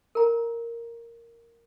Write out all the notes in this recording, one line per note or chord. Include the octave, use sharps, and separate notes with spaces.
A#4 A#5